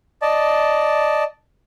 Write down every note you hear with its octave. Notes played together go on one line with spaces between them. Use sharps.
D5 D#5 A5